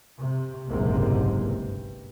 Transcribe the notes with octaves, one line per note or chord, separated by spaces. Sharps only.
C3
F#1 B1 G#2 C3 G#3 A#3
G2